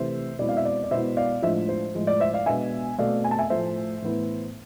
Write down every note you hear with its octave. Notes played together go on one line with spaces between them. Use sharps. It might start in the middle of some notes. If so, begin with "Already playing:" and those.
Already playing: C3 E3 A3 C5 E5
B2 G#3 C4 E4 D5
F5
E5
D5
D5
B2 G#3 B3 E4 C5 E5
D5 F5
A2 F3 G#3 D4 C5 E5
C5
A2 F3 G#3
D5
C5 E5
D5 F5
B2 G#3 B3 D4 E5 G#5
B2 A3 C4 D5 F5
G#5
A5
E5 G#5
A2 F3 A3 C5 E5
A2 E3 B3 E4